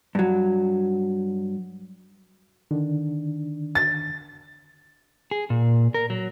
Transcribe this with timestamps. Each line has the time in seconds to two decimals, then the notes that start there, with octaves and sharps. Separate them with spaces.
0.15 G2 F#3
2.71 D3 D#3 D4
3.75 A6
5.31 G#4
5.50 A#2
5.94 A#4
6.10 F#3